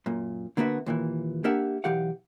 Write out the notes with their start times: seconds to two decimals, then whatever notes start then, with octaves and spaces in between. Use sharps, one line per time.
0.06 F#2 A#2
0.57 D3 A#3 B3 F#4 E5
0.86 D#2 A#2 D3 E3
1.44 A#3 D4 G4 A#4 E5 F#5
1.84 B1 E3 G4 F5 F#5